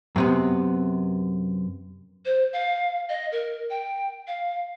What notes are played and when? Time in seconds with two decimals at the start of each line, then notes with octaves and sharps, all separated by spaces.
0.16 F#2 C3 B3
2.26 C5
2.53 F5
3.09 D#5
3.32 A#4
3.70 G5
4.27 F5